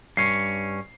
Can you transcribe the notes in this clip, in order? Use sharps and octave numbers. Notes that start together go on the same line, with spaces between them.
G2 C#4 C7